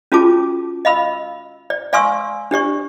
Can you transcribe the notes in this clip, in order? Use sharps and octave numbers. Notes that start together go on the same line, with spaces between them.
C#4 F4 F#4 G#4 A5 D6
D#5 F5 B5 E6
D5
D5 F5 G#5 C6 C#6 E6
D4 G4 D5 C#6